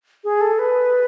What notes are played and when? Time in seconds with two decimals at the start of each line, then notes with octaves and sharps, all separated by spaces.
0.24 G#4
0.41 A4
0.59 B4